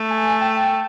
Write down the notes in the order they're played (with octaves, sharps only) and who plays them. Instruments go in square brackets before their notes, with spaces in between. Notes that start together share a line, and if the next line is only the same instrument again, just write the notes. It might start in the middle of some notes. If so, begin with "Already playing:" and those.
Already playing: [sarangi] A3
[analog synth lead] G#5
G5